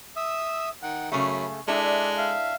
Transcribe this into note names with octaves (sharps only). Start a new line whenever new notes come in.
E5 D#6 E6
D#3 F#5
F#2 C#3 A3 B5
G#3 D4 E4 A4 D5 E5
E5 F5